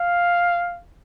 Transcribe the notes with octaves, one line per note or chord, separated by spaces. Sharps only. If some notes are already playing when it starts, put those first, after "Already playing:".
Already playing: F5